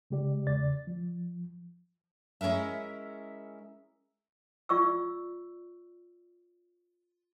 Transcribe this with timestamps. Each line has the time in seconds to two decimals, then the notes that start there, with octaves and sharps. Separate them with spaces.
0.11 C#3 G#3 G4 D5
0.47 E2 C#3 D5 A6
0.87 F3
2.41 G#3 C#4 E4 A#4 E5
4.69 F4 D5 C#6 E6